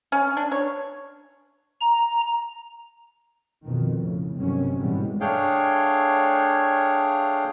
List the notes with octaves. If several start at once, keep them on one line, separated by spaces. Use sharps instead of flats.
C#4
D4
C#5
A#5
F2 B2 D#3
A2 C#3
G1 C3 D#3 F#3 C#4
G#2 B2 E3 G3 G#3 B3
A3 D4 G#4 C#5 F5 G5